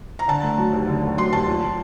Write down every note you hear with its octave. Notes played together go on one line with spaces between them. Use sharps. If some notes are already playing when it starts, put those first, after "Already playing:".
A#5
D3 A5
A3
F#3
D#2
D3
A3
F#3 C6
D#2 A5
A#2